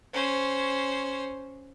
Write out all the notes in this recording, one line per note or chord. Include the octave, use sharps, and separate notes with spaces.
C#4 C5